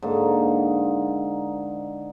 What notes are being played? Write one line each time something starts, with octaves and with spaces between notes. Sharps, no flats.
G#2 D3 A#3